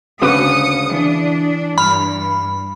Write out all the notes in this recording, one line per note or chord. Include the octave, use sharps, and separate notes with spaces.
D2 C#3 F#4 B4 F5 D6 D#6 C#7
E3 D4
G2 B5 F6